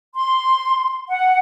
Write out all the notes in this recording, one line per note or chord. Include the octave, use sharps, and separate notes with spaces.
C6
F#5